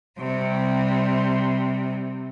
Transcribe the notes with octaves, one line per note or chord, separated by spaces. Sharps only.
C3 G3